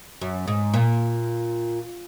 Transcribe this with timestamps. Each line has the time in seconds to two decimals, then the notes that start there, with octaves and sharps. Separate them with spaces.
0.21 F#2
0.47 G#2
0.74 A#2